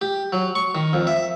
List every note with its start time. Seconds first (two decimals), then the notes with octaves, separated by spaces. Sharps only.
0.01 G4
0.33 F#3
0.55 C#6
0.75 D#3
0.93 F2
1.07 E5